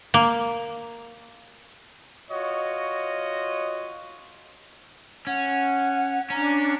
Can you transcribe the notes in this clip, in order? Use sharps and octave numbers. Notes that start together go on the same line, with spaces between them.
A#3
F4 F#4 C#5 D#5
C#4 F#5
C#4 D4 A#5